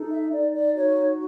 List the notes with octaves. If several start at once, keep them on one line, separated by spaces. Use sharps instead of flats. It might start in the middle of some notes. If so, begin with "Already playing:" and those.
Already playing: D#4 A4
E5
D#4 D5
D5
F#4 C#5